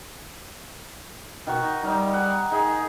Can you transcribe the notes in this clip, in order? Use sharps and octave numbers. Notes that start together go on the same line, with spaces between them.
B2 D#3 F#5 C#6
D#4
G3 D#4 F5
F#5 G#5
D#4 G#4